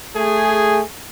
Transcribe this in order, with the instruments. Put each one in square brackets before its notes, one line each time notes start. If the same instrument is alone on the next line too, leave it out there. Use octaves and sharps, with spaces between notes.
[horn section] A3 G#4